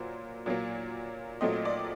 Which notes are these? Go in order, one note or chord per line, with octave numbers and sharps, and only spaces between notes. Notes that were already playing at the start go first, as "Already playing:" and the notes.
Already playing: A#2 F#3 A#3 C5
A#2 F#3 A#3
A#2 F#3 A3 C4 D#5
D5